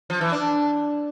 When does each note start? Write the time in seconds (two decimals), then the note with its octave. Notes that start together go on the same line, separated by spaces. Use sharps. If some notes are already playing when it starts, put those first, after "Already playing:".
0.10 F3
0.21 E3
0.32 D4